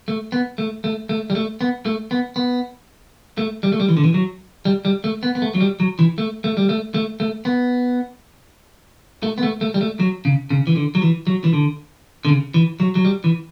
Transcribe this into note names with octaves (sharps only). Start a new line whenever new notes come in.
A3
B3
A3
A3
A3
G3
A3
B3
A3
B3
B3
A3
G3
A3
G3
E3
D3
E3
F#3
G3
G3
A3
B3
B3
A3
F#3
G3
F#3
E3
A3
A3
G3
A3
A3
A3
B3
A3
B3
A3
A3
G3
A3
F#3
C#3
C#3
E3
D3
F#3
E3
F#3
E3
D3
D3
C#3
E3
F#3
F#3
G3
E3